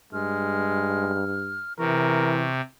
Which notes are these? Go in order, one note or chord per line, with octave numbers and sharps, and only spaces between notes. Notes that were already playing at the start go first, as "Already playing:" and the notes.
G2 G#3 F6
C3 E3 A#4 C#6